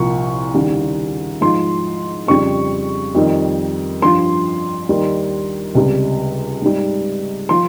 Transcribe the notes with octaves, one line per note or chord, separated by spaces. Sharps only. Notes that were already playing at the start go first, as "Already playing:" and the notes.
Already playing: C2 A#2 F3 C#6
D#2 C#3 G3
G#2 F3 C6
F2 C#3 G3 C#6
F2 D#3 G3
G2 F3 C6
D#2 D#3 G3
C#2 C3 G3
G#2 G3
F3 C6